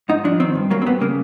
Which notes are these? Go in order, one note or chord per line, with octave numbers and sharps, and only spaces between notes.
G#2 D#4
F3 D4
D#3 C4
G2
F#3 A#3
C4
G2 B3
C#3 A#3